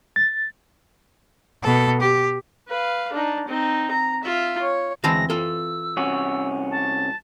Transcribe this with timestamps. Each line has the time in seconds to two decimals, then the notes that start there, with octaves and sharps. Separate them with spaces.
0.16 A6
1.63 B2 A4
2.01 G4
2.69 B4 F5
3.13 D4 D#4
3.48 C4 D#4
3.91 A#5
4.23 F4 E5
4.62 C#5
5.04 D2 E3 G#3 C4 F5 A5 A#6
5.30 F4 A4 E6
5.97 C2 C#4 F#4
6.71 A5